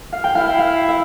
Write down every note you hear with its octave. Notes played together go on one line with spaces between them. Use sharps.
F5
G5
E4 F5
G5
F5
E5